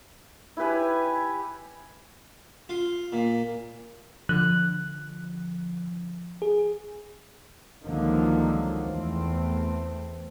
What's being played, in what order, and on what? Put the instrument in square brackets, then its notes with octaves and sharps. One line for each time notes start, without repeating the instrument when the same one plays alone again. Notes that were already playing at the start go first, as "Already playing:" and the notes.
[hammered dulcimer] E4 G4 B4 G#5
[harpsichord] F4
A#2
[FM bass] D3 [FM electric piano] F3 [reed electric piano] F#6
[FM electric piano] G#4
[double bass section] C#2 D3 D#3 F3 F#3 A#3
E2 A3 C4